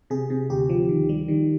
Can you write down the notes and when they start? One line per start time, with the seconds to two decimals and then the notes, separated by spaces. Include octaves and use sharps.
0.10 C3 G#4
0.30 C3
0.50 D2 G4
0.69 F3
0.89 D#3
1.09 G3
1.28 D#3